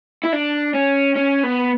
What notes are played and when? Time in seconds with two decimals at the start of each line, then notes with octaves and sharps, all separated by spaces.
0.24 E4
0.33 D4
0.74 C#4
1.16 C#4
1.43 B3